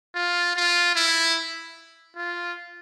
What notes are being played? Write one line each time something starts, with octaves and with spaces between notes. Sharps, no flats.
F4
F4
E4
F4